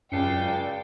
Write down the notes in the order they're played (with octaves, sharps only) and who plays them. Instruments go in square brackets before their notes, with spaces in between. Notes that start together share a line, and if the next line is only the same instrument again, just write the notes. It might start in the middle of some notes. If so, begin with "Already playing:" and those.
[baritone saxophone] C#2 [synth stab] F#2 [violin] D5 G5 [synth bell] A5 C7 C#7